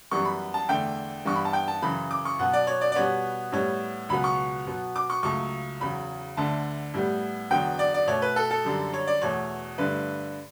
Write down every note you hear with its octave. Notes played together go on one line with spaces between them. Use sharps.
F#2 E3 G3 B3 C#6
B5
A5
E2 D3 A3 G5
G2 E3 B3 C#6
B5
A5
G5
A5
F#2 C#3 E3 B5
D6
C#6
B2 F#3 B3 F#5
D5
C#5
D5
D5
B2 G3 B3 C#5
A2 G3 B3 C#5
C#2 B2 F#3 B3 B5
C#6
B2 F#3 B3
D6
C#6
C#2 C#3 F#3 A3 C#6
E2 C#3 F#3 B5
D2 D3 A3 A5
A2 G3 B3
E2 D3 F#3 B3 G5
D5
D5
B2 A3 C#5
B4
A4
A4
F#2 D3 G3
C#5
D5
E2 B2 A3 C#5
G2 D3 A3 B4